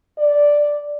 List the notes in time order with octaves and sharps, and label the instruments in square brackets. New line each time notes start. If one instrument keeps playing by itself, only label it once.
[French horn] D5